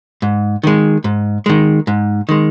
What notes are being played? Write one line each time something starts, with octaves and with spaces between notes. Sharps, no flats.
G#2
D#3 G#3
G#2
D#3 G#3
G#2
D#3 G#3